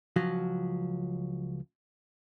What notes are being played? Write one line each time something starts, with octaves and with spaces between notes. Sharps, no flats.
C#2 F3 F#3 F#4